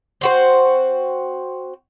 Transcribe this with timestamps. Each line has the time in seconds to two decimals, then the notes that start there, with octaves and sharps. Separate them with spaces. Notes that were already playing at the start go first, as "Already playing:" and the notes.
0.21 C4 F#4 C5